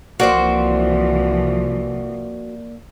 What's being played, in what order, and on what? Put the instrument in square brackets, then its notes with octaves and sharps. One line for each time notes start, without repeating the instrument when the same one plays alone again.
[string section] C2 E3 F3 [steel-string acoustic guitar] A#3 D5 [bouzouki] F#4 C5